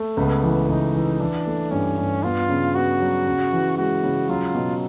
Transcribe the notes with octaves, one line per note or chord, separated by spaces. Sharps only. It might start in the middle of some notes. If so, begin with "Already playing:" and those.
Already playing: A3
C#2 B3
E3
C#2 D#4
E3
E3 D4
A3
G2 C#4
G2
B3 F4
C#3
B3 F#4
F#3
C#3
E3
G#3 F#4
C#3
F#3 F4
B2